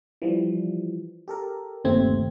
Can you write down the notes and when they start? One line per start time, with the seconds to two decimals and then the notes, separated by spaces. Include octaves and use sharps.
0.22 E3 F3 G3
1.28 G4 A4 A#4
1.85 G1 D#2 C3 A3 C4 G#6